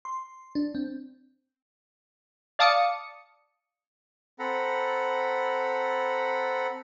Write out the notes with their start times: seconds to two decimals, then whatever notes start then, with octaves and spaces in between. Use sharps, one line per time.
0.05 C6
0.55 D4
0.75 C4
2.59 D5 F5 A5 D6 D#6 C#7
4.39 C4 A4 F#5 A#5 B5